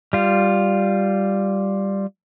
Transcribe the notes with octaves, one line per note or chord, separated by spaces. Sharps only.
G3 F4